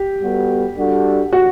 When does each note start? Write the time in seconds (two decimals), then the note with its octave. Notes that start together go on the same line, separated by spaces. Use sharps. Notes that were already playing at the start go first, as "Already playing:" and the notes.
Already playing: G4
0.21 G3 B3 F#4 A4
0.77 G3 D4 F#4 A4
1.33 F#4